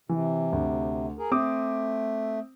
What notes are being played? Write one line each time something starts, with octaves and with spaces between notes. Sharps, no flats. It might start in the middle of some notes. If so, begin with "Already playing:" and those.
C3 E3
D2
G#4 A#4
A3 C4 D6 D#6